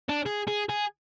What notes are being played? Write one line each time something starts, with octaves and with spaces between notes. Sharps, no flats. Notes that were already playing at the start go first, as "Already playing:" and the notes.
D4
G#4
G#4
G#4